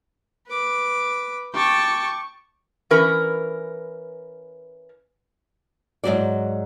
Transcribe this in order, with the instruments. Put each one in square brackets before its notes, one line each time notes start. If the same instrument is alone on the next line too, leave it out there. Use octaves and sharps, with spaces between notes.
[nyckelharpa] B4 D6
[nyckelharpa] G5 A5 [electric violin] C#6 D6
[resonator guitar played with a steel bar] E3 C#4 A#4 B4
[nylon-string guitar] G#2 C3 F#3 F#4 D5